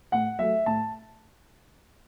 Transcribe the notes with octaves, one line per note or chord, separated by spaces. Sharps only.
A2 F#5
F#3 A3 E5
A2 A5